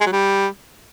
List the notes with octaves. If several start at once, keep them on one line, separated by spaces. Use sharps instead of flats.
G#3
F#3
G3